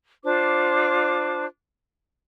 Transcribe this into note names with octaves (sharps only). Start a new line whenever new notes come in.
D4 F4 C5 D6